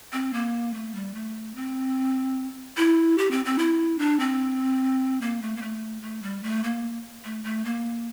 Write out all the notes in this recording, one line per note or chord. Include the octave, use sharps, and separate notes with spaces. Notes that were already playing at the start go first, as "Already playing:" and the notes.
C4
A#3
A3
G3
A3
C4
E4
G4
C4
C4
E4
D4
C4
A#3
A3
A#3
A3
A3
G3
A3
A#3
A3
A3
A#3